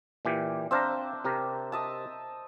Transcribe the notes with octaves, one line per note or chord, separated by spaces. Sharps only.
A#2 E3 G4
C4 D4 C5 E5 F5 A#5
C3 G4 A#4
D#5 E5 A5